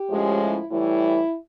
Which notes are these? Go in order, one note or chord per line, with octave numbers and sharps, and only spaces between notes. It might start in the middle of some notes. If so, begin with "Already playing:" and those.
Already playing: G4
A2 F3 G#3 C#4
E4
A2 E3 G3 E4